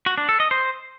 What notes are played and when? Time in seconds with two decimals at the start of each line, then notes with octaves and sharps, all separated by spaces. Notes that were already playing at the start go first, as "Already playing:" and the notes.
0.06 F#4
0.18 D4
0.29 A4
0.40 D#5
0.51 C5